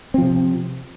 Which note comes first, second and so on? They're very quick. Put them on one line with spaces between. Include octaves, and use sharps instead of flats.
C4 F3 C3